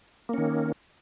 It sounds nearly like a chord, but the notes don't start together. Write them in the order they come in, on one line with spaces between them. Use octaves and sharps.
A#3 C#4 D#3